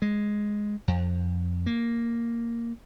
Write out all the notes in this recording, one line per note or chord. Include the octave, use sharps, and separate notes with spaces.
G#3
F2
A#3